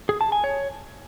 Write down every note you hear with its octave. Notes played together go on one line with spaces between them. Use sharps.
G#4
A5
G#5
C#5